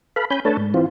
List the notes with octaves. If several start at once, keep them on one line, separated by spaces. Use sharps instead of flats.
A4 B4 F5 B5
C#4 G#5 B5 G6
A3 D4 A4 B4 C#5 A5
G#2
E3 C4 F4